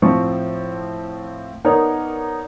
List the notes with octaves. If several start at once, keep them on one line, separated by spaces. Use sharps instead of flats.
A2 F3 C4 C#6
B3 D#4 A#4 C#5 D5